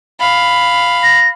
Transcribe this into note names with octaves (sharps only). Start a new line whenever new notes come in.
F5 B5
A#6